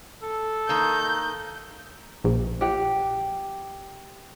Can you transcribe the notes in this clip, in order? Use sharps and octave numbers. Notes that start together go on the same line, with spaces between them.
A4
D#3 A#3 G6
A#1
G4 F#5